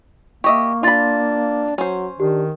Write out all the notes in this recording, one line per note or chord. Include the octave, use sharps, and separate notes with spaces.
A#3 G4 D#5 E5 C#6
D4 F4 B5 C6 A6
F#3 C#4 C5
D#3 D4 G4